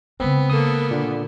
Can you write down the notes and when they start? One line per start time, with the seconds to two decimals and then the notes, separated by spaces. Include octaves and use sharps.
0.20 C#3 G#3 B3 C4
0.50 A#3 A4 D#6
0.91 A#2 D3